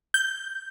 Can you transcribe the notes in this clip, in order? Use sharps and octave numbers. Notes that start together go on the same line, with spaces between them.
G6